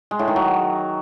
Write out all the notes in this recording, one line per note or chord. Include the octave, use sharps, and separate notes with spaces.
G#3
A2
D#3
F#3